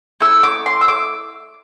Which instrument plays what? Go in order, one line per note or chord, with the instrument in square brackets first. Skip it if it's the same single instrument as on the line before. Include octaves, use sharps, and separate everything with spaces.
[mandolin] A3 E4 E6
D6
C6
E6
D6